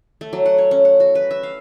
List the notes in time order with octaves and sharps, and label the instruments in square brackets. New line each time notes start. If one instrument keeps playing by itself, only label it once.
[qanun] A3
F#3
F#5
C#5
C#4
F#5
F#4
B4
E5
F5